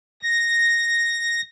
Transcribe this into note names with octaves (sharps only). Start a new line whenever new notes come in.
A#6